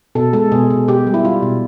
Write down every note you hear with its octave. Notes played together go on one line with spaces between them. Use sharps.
B2 A4
G#3 A4
B2 G#4
B2
B2 G4
G3
E4
G3 F4
B2